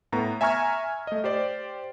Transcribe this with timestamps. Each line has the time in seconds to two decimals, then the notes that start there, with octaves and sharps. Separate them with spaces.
0.12 A2 B3 A#5
0.41 E5 G#5 A#5 C#6 F6 G#6
1.07 A3 D#5
1.24 G4 C5 D5